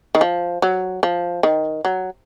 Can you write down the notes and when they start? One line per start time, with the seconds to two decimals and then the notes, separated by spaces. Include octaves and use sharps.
0.15 D#3
0.21 F3
0.62 F#3
1.03 F3
1.43 D#3
1.85 F#3